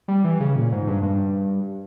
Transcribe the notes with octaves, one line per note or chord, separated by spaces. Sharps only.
G3
E3
C#3
A#2
G#2
G2
G2